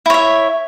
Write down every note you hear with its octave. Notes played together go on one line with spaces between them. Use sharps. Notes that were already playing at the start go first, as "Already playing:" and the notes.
E4 C#5 E5